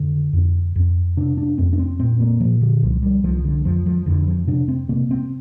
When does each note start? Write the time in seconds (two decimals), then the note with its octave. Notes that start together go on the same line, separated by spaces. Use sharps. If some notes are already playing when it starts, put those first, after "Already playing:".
Already playing: F2 D3
0.33 F2
0.76 F2
1.17 C3 D4
1.38 D4
1.58 F2 C4
1.73 D4
1.79 C4
2.00 A#2 C4
2.21 A#3
2.40 A#2 F3
2.61 D3
2.83 C2 F3
3.03 G3
3.24 C2 F3
3.39 F3
3.45 D3
3.64 F2 F3
3.86 F3
4.06 F2 D3
4.27 F3
4.47 C3 D4
4.68 C4
4.89 C3 A#3
5.11 C4